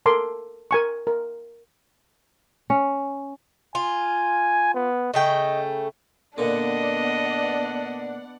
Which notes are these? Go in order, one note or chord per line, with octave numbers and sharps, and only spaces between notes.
A4 A#4 C6 D6
A#4 G#5 C#6
A#4
C#4
F4 G#5
B3
C#3 A3 D#5 G5
A#2 D3 B3 D4 D5 D#5 F#5